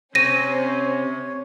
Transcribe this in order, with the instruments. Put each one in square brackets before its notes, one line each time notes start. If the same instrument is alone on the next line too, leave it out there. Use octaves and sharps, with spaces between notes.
[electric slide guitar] C3 C4 [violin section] C#4 C5 [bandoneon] C#5 [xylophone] A#6 D#7